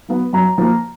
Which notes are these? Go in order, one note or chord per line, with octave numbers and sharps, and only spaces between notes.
F#3 B3
F#2 A#5
F3 A#3